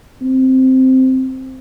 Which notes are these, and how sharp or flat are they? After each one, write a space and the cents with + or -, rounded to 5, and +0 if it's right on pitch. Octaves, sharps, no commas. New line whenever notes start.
C4 -5